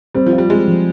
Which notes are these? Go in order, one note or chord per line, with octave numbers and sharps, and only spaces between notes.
G3 C4
F3
F4
G3
G#3 C4
F3